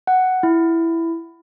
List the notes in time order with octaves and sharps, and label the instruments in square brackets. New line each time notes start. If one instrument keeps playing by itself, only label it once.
[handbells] F#5
E4